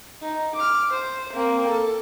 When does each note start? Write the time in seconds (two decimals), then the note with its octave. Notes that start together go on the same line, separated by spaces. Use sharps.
0.22 D#4
0.56 D6 F6
0.90 C5
1.34 A#3 C4
1.68 A4